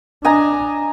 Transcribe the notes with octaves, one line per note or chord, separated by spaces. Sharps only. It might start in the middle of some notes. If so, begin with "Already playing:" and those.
D4 D#5 G#5 A#5